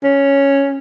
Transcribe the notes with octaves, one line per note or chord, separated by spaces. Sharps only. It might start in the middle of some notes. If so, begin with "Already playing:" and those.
C#4